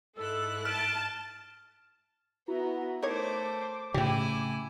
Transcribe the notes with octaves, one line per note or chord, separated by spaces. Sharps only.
G#2 E4 A4 E6 F#6
A5 F6 D7
B3 E4 F#4 A#5
A3 D#4 A#4 C5 C#5 D6
A2 C#3 E4 G4 G5 G#5